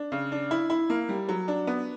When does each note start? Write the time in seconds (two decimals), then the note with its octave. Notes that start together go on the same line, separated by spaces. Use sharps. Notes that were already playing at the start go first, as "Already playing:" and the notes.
Already playing: D4
0.12 C#3
0.32 D4
0.51 E4
0.70 E4
0.90 A#3
1.09 G3
1.29 F#3
1.48 D4
1.67 B3